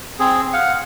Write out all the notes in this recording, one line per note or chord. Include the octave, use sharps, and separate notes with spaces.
C4 G#4
F5 F#5